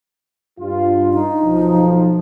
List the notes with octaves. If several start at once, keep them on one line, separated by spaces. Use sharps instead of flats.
G2 F4
D#4
B1 F3